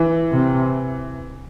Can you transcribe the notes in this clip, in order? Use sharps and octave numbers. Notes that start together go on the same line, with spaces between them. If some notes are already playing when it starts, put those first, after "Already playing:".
Already playing: E3
C3